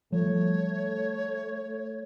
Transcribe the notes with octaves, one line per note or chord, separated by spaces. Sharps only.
F3 G3 A3 C#5